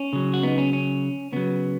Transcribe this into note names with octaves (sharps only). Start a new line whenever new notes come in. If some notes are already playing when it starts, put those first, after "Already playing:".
Already playing: C#4
C#3 F#3
F#4
B3 D#4
C#4
C#4
C#3 F#3 B3